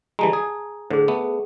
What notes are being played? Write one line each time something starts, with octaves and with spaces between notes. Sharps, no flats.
E3 G3 G#3 A5 A#5
G#4
A2 D3 G#4 C5
A3 B3